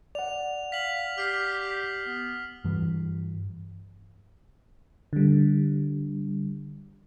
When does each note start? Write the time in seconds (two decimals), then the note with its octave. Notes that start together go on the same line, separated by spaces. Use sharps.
0.15 D5 F#5 F7
0.72 F5 B6 F#7
1.18 G4 F6 B6 C7
2.07 B3
2.64 G2 E3
5.13 D3 G3